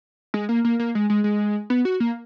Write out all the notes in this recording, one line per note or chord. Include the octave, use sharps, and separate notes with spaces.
G#3
A#3
A#3
A#3
G#3
G#3
G#3
B3
F#4
A#3